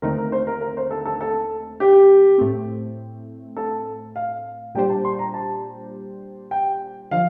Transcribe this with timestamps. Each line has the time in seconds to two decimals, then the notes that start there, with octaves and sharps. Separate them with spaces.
0.02 D#2 D3 A3 C4 D#4 A#4
0.18 A#4
0.32 C5
0.47 A#4
0.61 A#4
0.77 C5
0.91 A4
1.06 A4
1.21 A4
1.80 G4
2.38 A2 A3 C4
3.57 A4
4.16 F5
4.75 A#2 G3 D4 G4 C5 G5
4.90 A5
5.05 C6
5.19 A#5
5.34 A5
6.51 G5
7.11 D3 F3 F5